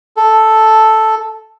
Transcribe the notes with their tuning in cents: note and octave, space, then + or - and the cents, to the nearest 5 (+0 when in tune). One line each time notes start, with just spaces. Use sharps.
A4 -5